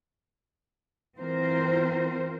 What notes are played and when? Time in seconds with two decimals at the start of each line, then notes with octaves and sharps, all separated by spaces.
1.19 E3 C4 F4 A#4 C5